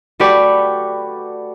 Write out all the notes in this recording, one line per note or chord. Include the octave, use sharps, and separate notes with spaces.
A3 F#4 G4 B4 D5